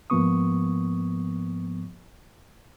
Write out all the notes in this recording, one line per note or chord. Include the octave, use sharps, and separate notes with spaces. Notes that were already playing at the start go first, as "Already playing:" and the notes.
G#2 F3 A#3 B3 C#6 D#6